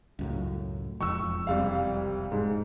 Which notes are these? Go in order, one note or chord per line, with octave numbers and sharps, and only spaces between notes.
C#2 F#2 A2
E1 F2 C#6 E6
C2 G3 F5
G#2